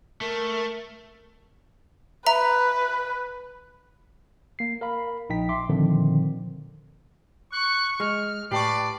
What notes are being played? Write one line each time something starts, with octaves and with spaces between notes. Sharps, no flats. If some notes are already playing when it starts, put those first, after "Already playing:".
A3 A#4
B4 E5 A#5
A#3 C7
A#4 F5 B5
A#1 D#4 G5 B6
E5 C6 D6
A#2 D3 D#3 F3 C4
C#6 F#6
G#3 F6
A2 G4 B4 D5 A5 C#6 C7